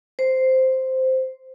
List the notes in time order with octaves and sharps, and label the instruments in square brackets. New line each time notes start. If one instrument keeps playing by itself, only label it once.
[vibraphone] C5